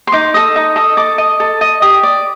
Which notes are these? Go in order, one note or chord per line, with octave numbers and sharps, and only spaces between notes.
C6
D#4 D6
A4 D#5
D#4
A4 D#5
A4 D6
D#5
A4
D#5
G4 D#6
D5